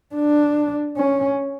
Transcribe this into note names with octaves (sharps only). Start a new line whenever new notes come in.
D4
C#4